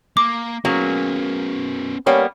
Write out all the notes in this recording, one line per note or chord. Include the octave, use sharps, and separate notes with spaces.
A#3 D6
F#3 A#3 B3 C#4 G#4
G3 A#3 B3 C#4